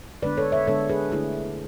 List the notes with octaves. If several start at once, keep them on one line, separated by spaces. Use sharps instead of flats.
D3 G#3 B3 D4 B4 D5
A4 C#5
C#5 E5
D3 G#3 B3 D4 A4 C#5
G#4 B4
D3 A3 D4 E4 G#4